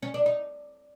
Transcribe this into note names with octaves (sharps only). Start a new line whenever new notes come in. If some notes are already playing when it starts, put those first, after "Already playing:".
C#4
D4
D#4